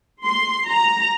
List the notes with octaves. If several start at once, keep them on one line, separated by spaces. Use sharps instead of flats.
C6
A#5